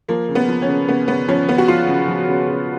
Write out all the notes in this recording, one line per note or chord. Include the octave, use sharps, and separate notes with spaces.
F3 A#3
C#3
B3
F3
C#4
C#3
C#3 B3
C#3 B3
F3 C#4
C#3 B3
F#4
F3 F4
C#3
F3
C#3
C#3